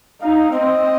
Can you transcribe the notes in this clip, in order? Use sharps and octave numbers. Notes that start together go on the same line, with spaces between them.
D#4 F5
C4 D#5